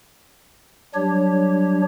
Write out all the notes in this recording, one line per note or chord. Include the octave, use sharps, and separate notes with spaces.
F#3 G3 D4 G4 C#5